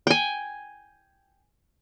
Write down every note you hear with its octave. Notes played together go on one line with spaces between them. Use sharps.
G5 G#5